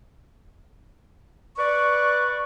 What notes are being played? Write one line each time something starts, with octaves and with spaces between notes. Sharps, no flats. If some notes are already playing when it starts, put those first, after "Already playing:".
B4 D5 C#6